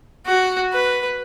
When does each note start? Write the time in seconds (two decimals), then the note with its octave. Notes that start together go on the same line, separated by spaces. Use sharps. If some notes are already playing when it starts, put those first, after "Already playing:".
0.26 F#4
0.73 B4